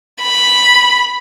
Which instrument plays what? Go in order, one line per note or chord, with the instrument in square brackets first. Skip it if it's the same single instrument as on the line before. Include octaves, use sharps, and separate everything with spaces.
[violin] B5